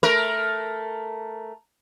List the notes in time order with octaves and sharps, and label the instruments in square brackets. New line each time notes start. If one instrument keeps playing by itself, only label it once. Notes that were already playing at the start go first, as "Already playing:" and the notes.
[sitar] A3 A#4